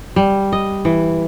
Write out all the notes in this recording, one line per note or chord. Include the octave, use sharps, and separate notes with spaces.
G3
D#5
E3